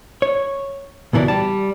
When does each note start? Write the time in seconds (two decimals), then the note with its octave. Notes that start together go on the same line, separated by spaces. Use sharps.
0.22 C#5
1.13 C#2 B2 E3 A#4 D5
1.28 G3 A5